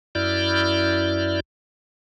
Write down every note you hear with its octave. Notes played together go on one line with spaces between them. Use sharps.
F#2 E4 D5 F6 G6